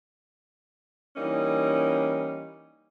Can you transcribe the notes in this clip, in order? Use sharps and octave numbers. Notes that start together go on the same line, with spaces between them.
E3 G3 A#3 C#4 D#4